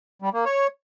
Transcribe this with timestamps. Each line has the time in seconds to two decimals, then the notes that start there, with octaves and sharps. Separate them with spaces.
0.22 G3
0.34 A#3
0.45 C#5